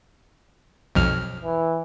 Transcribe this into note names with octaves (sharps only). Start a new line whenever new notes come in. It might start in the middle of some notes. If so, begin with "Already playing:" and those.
B1 F2 F6
E3